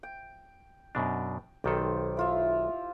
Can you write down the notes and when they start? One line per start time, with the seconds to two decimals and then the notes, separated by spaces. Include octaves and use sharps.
0.03 G5
0.95 F#2 B2 D4
1.64 B1 D#3 G4 A4 C5
2.17 E4 F4 E5